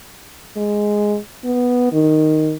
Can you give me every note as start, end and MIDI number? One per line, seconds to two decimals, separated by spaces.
0.57 1.17 56
1.44 1.89 59
1.92 2.55 51